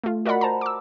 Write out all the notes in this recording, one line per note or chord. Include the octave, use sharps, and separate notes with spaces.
A3 F4
F#4 A#4 D5 D#5 F#5 B5
C5 A5 A#5
D6 E6